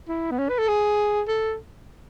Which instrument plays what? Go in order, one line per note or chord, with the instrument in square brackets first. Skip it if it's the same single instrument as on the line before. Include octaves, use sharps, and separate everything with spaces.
[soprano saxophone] E4
B3
C#4
B4
A4
G#4
A4